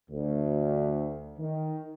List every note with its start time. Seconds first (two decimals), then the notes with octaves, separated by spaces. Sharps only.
0.10 D2
1.38 D#3